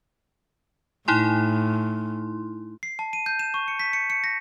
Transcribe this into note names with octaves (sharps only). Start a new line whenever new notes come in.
A2 D#4 E4 C6
C7
A5
D#7
G6
E7
C#6
C#7
B6
C#7
C#7
A#6